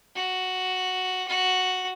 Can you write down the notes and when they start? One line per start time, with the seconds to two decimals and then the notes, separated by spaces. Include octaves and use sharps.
0.16 F#4
1.27 F#4